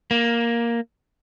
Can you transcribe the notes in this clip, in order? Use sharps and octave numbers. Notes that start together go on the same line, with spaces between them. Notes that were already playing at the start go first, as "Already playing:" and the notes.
A#3